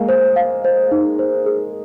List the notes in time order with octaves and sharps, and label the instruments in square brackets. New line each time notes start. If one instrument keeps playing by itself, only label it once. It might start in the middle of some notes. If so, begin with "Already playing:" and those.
Already playing: [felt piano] G#3 A#3 [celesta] F5
[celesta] C5
F5
C5
D#4
C5
G#4